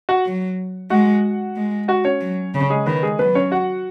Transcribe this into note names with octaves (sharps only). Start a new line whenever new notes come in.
F#4 F#5
F#3
G#3 F#4 F#5
G#3
F#4 F#5
C#4 C#5
F#3
C#3
G#3 G#4
D#3 B3 B4
G#3 G#4
F#3 B3 B4
C#4 C#5
F#4 F#5